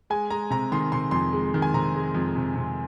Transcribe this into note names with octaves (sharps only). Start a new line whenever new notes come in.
G#3 G#5
G#3 A#5
C3 A#5
D#3 C6
C3 C6
F2 C6
G#3
D#3
G#5
C3 A#5
G#3
F2
C3
C3